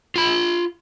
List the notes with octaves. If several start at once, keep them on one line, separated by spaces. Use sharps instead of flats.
F4 B5